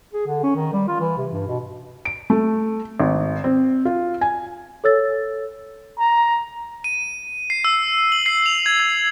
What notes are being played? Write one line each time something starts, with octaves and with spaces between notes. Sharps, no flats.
G#4
D3
C#4
D#3
G3
F4
E3
C3
G2
B2
D7
A3
G#1
C4
F4
G#5
A4 C#5 E6 A6
A#5
D#7
C7
E6
F#7
C7
F7
G#6
G#6